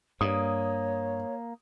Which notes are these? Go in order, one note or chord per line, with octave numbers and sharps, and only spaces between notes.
G2 A#3 C#5 D#6